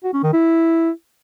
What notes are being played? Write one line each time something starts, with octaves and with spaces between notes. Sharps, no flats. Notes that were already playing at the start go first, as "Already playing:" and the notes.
F#4
C#4
D#3
E4